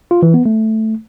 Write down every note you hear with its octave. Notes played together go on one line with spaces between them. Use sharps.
F4
E3
B3
A3